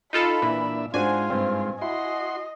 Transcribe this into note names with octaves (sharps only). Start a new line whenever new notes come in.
D#4 F4 A4 B5
A#2 E3 D4 E5
G#2 D4 F4 F#4 C5 G#5
G2 C4
E4 F#4 D#5 C6